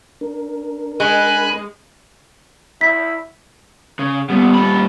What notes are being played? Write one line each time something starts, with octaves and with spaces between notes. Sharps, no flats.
D4 A#4
G#3 G#5 B5 F#6
E4 B6
C#3
A#2 G3 B3
A#3 B5